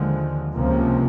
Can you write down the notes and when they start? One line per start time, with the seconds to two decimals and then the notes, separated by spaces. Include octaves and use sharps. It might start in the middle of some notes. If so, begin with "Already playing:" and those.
Already playing: D#2 D3 F3 G#3
0.54 C#2 C3 F3 A#3